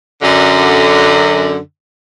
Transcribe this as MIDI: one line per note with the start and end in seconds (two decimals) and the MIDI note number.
0.22 1.57 42
0.22 1.57 50